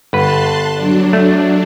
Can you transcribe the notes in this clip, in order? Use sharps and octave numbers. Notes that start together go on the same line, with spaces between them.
G1 B4 A5 C6 F#6
F#3 D4
A3